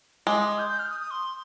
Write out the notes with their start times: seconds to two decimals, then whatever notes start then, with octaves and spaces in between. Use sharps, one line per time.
0.27 G#3 D6
0.38 D#6
0.48 D#6
0.59 G6
0.69 G6
0.79 F6
0.90 D#6
1.01 D#6
1.11 C6